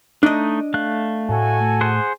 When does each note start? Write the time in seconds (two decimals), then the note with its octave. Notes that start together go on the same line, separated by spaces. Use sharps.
0.23 A3 D4 D#4 D#5
0.74 A3 F5 F#6
1.29 A2 F#4 A4 G#5
1.81 G#4 C5 F#5